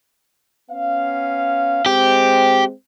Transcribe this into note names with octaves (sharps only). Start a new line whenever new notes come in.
B3 C#4 F5
G#3 C4 G4